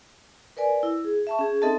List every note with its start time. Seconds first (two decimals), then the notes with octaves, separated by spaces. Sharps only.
0.57 A#4 B4 D5 G#5
0.83 E4
1.05 G#4
1.27 E5 A5 C#6
1.39 C#4 G#4
1.62 C4 D#4 A4 D#5 E5 A5